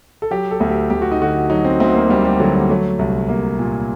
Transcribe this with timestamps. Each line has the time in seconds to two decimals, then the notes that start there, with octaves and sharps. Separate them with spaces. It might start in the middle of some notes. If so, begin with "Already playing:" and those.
0.22 A4
0.31 F#3 G4
0.51 A4
0.60 D2
0.71 G4
0.90 D2 G4
1.02 F#4
1.11 D#4
1.21 D3 F#4
1.50 F#3 D#4
1.64 C4
1.80 D2 C4
1.95 A#3
2.10 D2 G3
2.25 G3
2.40 D3 F#3
2.54 G3
2.70 F#3 A3
2.99 C2
3.29 C2 A#3
3.59 A#2